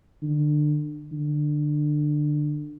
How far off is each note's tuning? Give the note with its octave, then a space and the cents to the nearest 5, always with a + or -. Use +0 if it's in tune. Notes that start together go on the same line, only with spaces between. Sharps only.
D3 +25
D3 +20